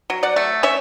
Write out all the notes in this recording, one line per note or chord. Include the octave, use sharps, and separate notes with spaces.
F#3
D5 F#5
A3
C#4 C#5 E5